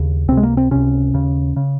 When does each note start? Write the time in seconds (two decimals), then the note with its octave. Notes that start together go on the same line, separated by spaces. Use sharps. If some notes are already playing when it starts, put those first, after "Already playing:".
Already playing: D#2 C#3
0.28 C#2 C3 C4
0.37 G#3
0.43 A#3
0.57 C4
0.71 C#2 C3 C#4
1.14 D#2 C#3
1.56 C#3